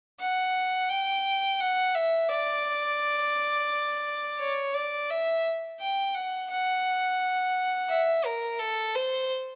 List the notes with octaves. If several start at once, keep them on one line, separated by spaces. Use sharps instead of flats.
F#5
G5
F#5
E5
D5
C#5
D5
E5
G5
F#5
F#5
E5
A#4
A4
C5